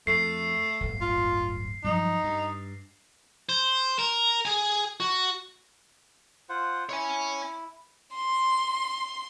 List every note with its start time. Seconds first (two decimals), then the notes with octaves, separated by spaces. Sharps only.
0.07 F2 A3 C7
0.81 D1 G1
1.01 F4
1.84 G2 F3 F#3 D#4
2.24 G2
3.49 C5
3.99 A#4
4.45 G#4 G#5
5.00 F#4
6.49 F4 C5 F#5
6.89 E4 C#5 G#5
8.16 C6